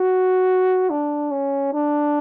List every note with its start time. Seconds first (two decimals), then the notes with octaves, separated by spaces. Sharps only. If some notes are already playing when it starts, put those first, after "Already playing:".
Already playing: F#4
0.90 D4
1.31 C#4
1.73 D4